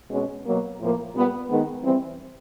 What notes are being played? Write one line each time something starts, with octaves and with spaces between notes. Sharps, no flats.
B2 G#3 C#4
B2 F#3 A#3
A2 F3 A#3
A#2 G3 B3
D#3 G#3 B3
E3 G3 C4